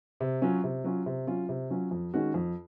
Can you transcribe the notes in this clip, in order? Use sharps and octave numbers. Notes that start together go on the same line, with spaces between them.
C3
F#3 C#4 F4
C3
F#3 C#4 F4
C3
F#3 C#4 F4
C3
F#3 C#4 F4
F2
D#3 G#3 C#4 F#4
F2